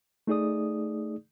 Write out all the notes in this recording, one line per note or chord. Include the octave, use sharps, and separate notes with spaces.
A3 D#4 G#4 D5 D#6